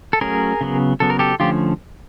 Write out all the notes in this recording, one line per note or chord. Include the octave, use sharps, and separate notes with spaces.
A4
F#3 A3 C#4 G#4 A#4
C#3 F#3 B3
C#3 F#3 B3 A4
A#4
G4 A4
D3 F3 A3 C#4 F4 G4